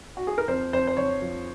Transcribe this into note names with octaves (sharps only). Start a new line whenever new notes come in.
F#4
G#4
A#4
F2 C5
F2 C5
C5
F2 C#5
F3